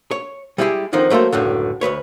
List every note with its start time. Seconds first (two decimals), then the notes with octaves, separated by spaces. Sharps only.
0.11 C#5
0.58 G3 G#3 E4 F4 G4 G#4
0.93 D3 D#3 F3 C4 D#4
1.10 F#3 A3 A#3 A4 C5
1.33 C#2 F#2 A2 D3
1.81 D2 G#2 B4 C#5